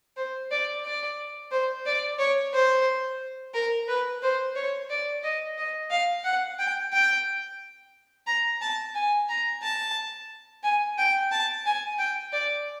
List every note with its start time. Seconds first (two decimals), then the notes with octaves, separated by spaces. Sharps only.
0.17 C5
0.51 D5
0.85 D5
1.51 C5
1.86 D5
2.19 C#5
2.54 C5
3.54 A#4
3.88 B4
4.23 C5
4.55 C#5
4.90 D5
5.23 D#5
5.58 D#5
5.91 F5
6.24 F#5
6.59 G5
6.93 G5
8.27 A#5
8.61 A5
8.95 G#5
9.29 A#5
9.63 A5
10.63 G#5
10.98 G5
11.32 A5
11.66 G#5
11.99 G5
12.33 D5